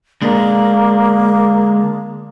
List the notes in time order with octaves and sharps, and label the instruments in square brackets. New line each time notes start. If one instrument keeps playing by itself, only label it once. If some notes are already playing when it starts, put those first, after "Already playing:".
[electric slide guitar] D3 G#3 D4 [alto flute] A#3